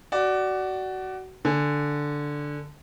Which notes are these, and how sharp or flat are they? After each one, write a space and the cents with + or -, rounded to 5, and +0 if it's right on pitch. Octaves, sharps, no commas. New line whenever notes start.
F#4 +20 D5 +0
D3 +0 G#5 +0